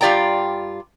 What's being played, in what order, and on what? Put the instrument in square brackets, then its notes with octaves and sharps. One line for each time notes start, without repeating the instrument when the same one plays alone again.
[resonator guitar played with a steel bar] G2 F4 G4 D5 G5 A#5